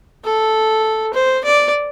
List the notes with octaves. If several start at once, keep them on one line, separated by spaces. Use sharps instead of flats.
A4
C5
D5